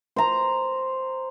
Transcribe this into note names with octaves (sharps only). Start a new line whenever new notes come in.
C5 A#5